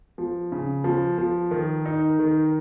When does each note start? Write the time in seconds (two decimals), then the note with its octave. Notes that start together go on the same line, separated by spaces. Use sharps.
0.18 F3
0.52 C#3
0.84 F3
1.18 F3
1.51 D#3
1.86 D#4
2.19 D#3